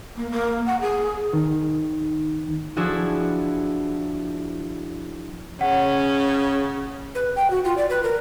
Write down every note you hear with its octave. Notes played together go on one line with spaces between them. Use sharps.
A#3
A#3
F#5
G#4
D#3
F3 D4 E4 F#4 G#4
C#3 C#4 F#5
B4
G5
F#4
F4
D5
B4
A#4